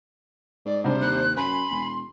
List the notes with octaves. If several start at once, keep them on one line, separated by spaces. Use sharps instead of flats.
G#2 D5
C3 G3 D4 C5
D#2 F#6
F#2 G#5 B5 C6
E1